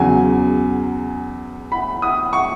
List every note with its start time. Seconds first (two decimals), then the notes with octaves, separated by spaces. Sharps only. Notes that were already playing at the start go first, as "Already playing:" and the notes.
Already playing: E2 C#3 F#3 G#5
1.72 B5
2.02 D#6
2.33 C#6